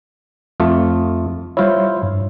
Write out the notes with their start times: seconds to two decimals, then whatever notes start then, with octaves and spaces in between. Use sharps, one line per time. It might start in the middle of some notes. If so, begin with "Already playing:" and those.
0.60 F2 A3 F4
1.57 G3 E4 F4 C5 C#5
2.03 G2